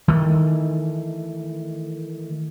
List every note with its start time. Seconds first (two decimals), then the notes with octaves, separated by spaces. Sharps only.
0.08 D#3 E3 G3 A3